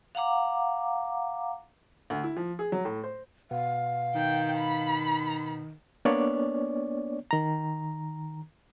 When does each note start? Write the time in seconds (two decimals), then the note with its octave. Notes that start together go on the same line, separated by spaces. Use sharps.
0.15 F5 F#5 A#5 D6
2.10 D2
2.23 E4
2.37 F3
2.59 G#4
2.72 F#3
2.85 A2
3.04 C5
3.51 B2 B4 F5 F#5
4.15 D#3 G5
4.57 B5
6.05 A#3 B3 D4 C#5 D5
7.31 D#3 A#5